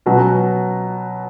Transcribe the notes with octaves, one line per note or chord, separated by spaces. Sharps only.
B2 F#3 C#4